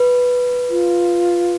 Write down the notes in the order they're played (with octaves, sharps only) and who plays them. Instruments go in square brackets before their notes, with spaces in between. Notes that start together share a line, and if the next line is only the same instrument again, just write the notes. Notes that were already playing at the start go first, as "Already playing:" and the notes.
Already playing: [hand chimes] B4
[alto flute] F4